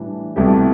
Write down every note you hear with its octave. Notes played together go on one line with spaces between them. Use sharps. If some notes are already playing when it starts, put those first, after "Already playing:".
Already playing: A2 E3 G3 D4
C2 B2 A3 E4 G4